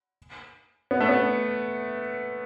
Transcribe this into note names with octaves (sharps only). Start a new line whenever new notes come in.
B3
A3
B3